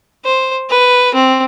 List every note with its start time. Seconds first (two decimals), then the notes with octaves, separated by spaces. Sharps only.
0.25 C5
0.70 B4
1.14 C4